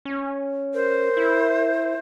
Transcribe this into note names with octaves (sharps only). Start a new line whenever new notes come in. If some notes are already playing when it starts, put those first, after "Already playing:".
C#4
A#4 C5
E4